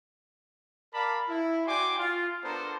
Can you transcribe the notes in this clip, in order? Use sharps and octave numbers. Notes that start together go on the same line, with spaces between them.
A#4 D5 F5 A5 B5
E4
F#4 D5 G5 G#5 C6 D6
F4
B3 D4 A4 A#4 C5